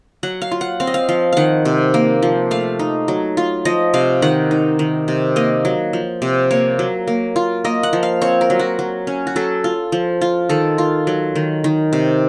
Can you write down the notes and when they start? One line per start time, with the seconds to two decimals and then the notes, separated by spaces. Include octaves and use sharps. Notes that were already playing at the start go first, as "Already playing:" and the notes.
0.23 F#3 F#5
0.42 F5
0.51 F4
0.61 F#5
0.80 C4 F5
0.87 D#5
0.94 F5
1.09 F3 F5
1.33 D#3 F5 F#5
1.65 C3
1.94 A#3
2.22 F3
2.51 A3 F5
2.79 D#4
3.08 F#3
3.37 F4
3.65 F3 D#5
3.94 C3 F5
4.22 D#3 F#5
4.51 D#4
4.79 D#3
5.08 C3
5.36 A#3 D#5
5.65 F#3
5.93 F3
6.22 C3
6.51 A#3 C#5
6.79 F#3
7.07 A#3
7.36 F4
7.65 A#3 D#5
7.83 F#5
7.93 F3
8.03 F5
8.21 C4 C#5
8.41 A#4
8.50 F#3
8.59 F#4
8.79 F#3
9.07 C#4
9.27 F#4
9.36 F#3 A4
9.64 F4
9.92 F3
10.21 F4
10.49 D#3 A4
10.78 F4
11.07 F#3
11.35 D#3
11.64 D#3
11.93 C3